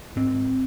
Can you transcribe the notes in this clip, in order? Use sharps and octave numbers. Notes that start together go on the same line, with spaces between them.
G#2 C4